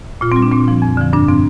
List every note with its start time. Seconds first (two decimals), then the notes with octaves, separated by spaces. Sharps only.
0.21 A#2 F4
0.32 C4
0.36 G3
0.42 D4
0.51 A#2 C4
0.68 F3
0.82 F2
0.97 D3 F3
1.13 G2 D4
1.28 F3 C4